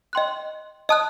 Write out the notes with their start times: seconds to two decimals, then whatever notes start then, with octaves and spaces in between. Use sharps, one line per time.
0.13 D#5 G5 C6 F#6
0.89 D#5 A5 D#6 F#6